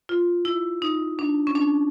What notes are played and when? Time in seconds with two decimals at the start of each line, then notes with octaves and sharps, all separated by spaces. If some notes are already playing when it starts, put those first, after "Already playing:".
0.09 F4
0.45 E4
0.82 D#4
1.19 D4
1.47 C#4
1.55 D4